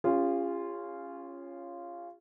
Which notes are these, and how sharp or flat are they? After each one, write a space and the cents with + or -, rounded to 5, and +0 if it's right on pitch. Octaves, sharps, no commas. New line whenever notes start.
C#4 -5 F4 -10 G#4 -45